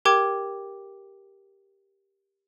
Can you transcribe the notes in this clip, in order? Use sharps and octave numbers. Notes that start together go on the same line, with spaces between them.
G4 A#4 G5 D6 G#6